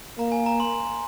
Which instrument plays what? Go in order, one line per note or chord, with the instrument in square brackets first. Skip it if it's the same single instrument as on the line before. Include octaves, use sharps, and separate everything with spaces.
[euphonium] A#3 [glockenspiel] A#5
[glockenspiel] G#5
A#5
C6